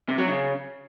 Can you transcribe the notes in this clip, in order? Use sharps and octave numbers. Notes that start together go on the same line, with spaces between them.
C3
F#3
C#3